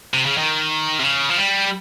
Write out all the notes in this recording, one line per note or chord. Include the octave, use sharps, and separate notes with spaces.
C3
C#3
D#3
C3
C#3
F3
G3